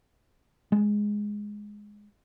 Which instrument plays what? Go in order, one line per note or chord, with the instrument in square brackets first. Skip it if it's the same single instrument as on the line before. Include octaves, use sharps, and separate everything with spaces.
[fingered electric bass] G#3